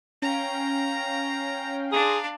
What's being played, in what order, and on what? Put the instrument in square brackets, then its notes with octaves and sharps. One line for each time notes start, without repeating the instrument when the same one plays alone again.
[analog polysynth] C#4 F5 G5 [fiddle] A#5
[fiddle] D4 F5 [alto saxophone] G#4 [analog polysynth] A#5 C6